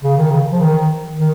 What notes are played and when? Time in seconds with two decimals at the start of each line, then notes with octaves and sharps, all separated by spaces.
0.03 C#3
0.17 D#3
0.31 C#3
0.52 F3
0.61 D#3
1.18 D#3